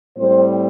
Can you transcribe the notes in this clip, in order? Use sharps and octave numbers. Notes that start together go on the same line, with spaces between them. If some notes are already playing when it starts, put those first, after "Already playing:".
A2 G3 C4 C5